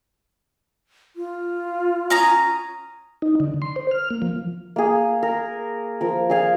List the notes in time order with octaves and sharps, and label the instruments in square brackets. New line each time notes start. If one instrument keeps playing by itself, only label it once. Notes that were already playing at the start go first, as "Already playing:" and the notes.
[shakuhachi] F4
[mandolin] C#4 A#5 D#6
[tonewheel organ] D#4
D3
C6
C5
F6
A#3
F3
[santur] A#3 G#4
A#4
F3 A#4
G#4 D5 F5 G#5